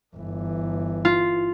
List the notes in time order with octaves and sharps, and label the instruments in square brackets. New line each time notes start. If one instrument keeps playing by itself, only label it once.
[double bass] G1 E3
[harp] F4